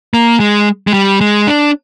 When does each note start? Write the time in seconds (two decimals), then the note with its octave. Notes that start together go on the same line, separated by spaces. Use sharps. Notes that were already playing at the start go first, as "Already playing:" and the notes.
0.14 A#3
0.40 G#3
0.87 G#3
0.94 G3
1.21 G#3
1.47 D4